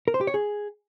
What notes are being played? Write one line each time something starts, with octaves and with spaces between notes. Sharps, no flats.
A#4
C5
G4
C#5
G#4